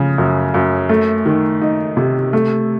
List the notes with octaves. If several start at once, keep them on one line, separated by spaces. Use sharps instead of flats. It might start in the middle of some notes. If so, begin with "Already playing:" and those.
Already playing: C#3 F3
F#2
F#2
A3
D#3
D#4
C3
A3